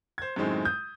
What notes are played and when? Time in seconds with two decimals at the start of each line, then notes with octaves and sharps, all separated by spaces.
0.18 C5 G#6
0.36 F#2 A2 D#3 G#3 C4
0.65 D#6 G6